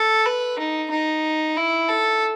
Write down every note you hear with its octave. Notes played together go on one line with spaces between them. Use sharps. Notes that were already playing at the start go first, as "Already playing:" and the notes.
Already playing: A4
B4
D#4
D#4
E4
A4